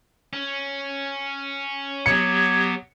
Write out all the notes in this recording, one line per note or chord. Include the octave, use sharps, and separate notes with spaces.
C#4
F#3 B3 G4 G#6 C#7